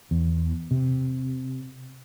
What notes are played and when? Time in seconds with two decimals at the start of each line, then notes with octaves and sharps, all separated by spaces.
0.11 E2
0.71 C3